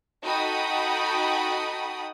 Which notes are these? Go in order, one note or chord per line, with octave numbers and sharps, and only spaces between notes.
D#4 F#4 A4 G5 B5 D#6